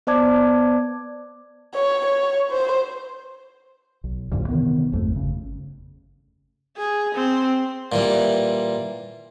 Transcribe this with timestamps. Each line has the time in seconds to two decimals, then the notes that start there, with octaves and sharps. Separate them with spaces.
0.07 B3 C5 D5 A5 D6 G#6
1.74 C#5
2.06 C#5
2.51 C5
4.04 B1
4.31 C2 F#2 A#2 D3
4.48 C3 D#3 E3 B3
4.92 G#1 F2 D3 A3
5.15 G1 C#3
6.77 G#4
7.15 C4
7.92 A#2 E3 G3